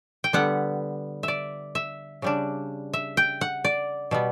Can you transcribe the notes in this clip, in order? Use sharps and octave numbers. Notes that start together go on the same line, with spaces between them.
G5
D3 G3 B3 F#5
D5 E5
E5
C#3 G3 D4
E5
G5
F#5
D5
B2 G3 B3